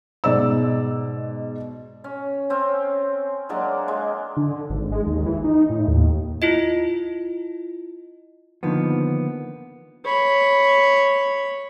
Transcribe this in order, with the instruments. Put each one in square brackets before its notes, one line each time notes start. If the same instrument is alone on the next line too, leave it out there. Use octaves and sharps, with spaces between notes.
[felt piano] G#2 B2 D5 E6
[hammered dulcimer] C#4
C4 C#4
F#3 G#3 A#3 D4
G#3
[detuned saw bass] D3
G#1
G#3
D#2
E3
D#4
A2
D#2
[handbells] E4 F4 D#5
[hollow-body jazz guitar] D3 D#3 F3 A#3 B3
[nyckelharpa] C#5 B5